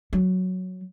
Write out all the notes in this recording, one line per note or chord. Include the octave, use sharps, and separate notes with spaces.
F#3